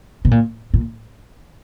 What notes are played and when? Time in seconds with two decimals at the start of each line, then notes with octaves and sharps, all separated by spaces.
0.25 B2
0.31 A#2
0.74 A#2